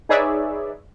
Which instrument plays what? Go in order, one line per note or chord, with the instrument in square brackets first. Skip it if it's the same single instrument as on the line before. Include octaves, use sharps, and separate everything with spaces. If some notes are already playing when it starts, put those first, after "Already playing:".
[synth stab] D#4 G#4 B4 C#5 D5 E5